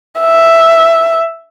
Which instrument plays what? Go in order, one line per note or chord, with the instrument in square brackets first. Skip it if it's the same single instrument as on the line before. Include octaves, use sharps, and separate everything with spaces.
[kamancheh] E5